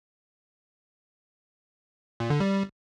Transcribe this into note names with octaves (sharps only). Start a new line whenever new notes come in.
A#2
D3
G3